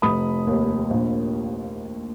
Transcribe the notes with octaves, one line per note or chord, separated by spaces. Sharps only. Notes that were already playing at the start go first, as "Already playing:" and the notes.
F1 B5 D#6
D#2
A#1